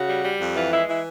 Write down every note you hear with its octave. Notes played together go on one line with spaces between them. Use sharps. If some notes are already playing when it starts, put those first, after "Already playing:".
Already playing: C#3 F#4
G3
G3
F2
E3 F4
G#3 E4
E3 E4